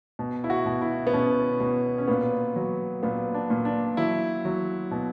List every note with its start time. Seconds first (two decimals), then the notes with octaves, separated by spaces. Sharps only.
0.19 B2
0.44 E4
0.50 F#4
0.66 B2
0.81 E4
1.07 B3
1.13 B2 C#4
1.60 B2
1.98 C#4
2.07 A#2 B3
2.56 F#3
3.03 A#2 B3
3.34 D4
3.50 A#2
3.65 D4
3.97 F#3 E4
4.45 F#3
4.91 B2